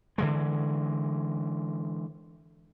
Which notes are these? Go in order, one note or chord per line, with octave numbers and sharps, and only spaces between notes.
D3 E3 G#3